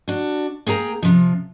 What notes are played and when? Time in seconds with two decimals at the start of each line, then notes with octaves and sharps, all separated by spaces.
0.08 D4 F#4
0.66 A#3 G#4 G5 A#5
1.02 C3 F3